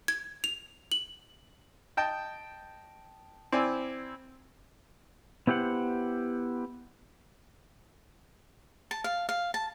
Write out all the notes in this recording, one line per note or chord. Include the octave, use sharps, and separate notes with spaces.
G#6
F7
F#7
D#5 G5 A5
C4 E4 D5 G#5
B3 E4 G4 C5 F#5
A5
F5
F5
A5